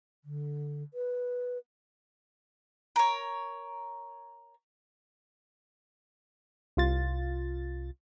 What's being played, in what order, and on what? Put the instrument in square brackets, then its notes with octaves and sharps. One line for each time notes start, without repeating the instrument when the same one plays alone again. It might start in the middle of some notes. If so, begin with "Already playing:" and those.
[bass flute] D3
B4
[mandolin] A#4 C#5
[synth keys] C2 F4 A6